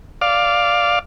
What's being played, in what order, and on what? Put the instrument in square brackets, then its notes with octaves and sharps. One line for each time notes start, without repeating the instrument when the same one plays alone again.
[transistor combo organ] D5 F5